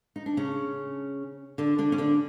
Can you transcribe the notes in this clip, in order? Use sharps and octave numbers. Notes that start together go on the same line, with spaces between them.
D#4
D4
C#3 C#4
D3 D4
D3 D4
C#4
D3 D4